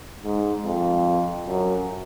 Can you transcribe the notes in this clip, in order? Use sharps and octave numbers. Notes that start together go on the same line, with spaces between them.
G#2
F2
F#2